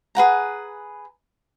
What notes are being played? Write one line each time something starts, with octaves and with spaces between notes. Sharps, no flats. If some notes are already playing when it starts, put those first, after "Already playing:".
G#4 B4 F#5 A#5